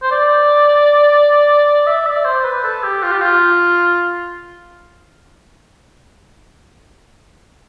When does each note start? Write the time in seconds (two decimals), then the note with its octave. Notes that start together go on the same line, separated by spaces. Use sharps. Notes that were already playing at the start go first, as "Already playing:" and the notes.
0.02 C5
0.11 D5
1.86 E5
2.06 D5
2.24 C5
2.44 B4
2.63 A4
2.83 G4
3.03 F4
3.11 G4
3.21 F4